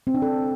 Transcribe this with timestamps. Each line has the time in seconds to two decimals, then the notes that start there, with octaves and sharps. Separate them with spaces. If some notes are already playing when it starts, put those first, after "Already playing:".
0.07 C4
0.14 D4
0.22 A4